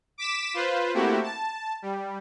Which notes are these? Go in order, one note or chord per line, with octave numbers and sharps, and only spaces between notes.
D6 B6 E7
F4 B4 C5
A3 A#3 C4 E4 F#4 G4
A5
G3